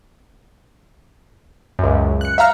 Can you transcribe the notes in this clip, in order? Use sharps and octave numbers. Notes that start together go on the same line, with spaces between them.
C#2 F#2
F#6 C#7
E5 F5 A#5 F6